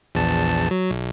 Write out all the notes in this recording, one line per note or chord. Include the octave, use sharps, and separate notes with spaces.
A#1 E2 A5
F#3
B1